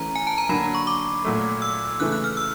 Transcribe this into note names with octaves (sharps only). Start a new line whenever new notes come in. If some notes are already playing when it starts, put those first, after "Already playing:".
Already playing: E3 A3 C#4 A#5
G#5
A5
A#5
D3 F#3 A#3 B5
C#6
D6
A#2 F#3 A3
E6
C#3 E3 A3 F#6
F#6
F6
E6